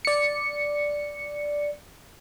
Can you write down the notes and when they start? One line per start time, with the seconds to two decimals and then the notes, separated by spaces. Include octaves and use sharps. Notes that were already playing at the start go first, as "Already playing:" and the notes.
0.05 D5 C#7